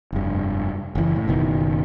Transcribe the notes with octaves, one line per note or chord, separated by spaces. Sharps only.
F1 G2
F#1 E3
A2
F#1 B2 D#3